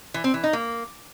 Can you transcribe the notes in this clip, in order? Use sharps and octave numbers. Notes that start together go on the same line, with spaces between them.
E3
C4
E3
D#4
A#3